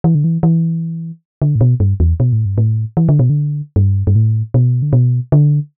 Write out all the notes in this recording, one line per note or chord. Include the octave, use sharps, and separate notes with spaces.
E3
D3
E3
E3
D3
A2
B2
G2
E2
B2
A2
G2
A2
E3
D3
B2
D3
G2
G2
A2
B2
D3
B2
D3